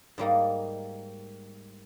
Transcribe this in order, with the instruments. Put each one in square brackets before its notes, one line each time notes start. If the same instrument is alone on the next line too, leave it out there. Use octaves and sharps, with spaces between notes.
[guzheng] G#2 G3 A#3 D#4